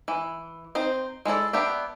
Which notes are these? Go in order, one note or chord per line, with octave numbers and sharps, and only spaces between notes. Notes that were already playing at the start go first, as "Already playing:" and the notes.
E3
C4 D#4 C5
G#3 E4 A4 D5
B3 D4 G4 E5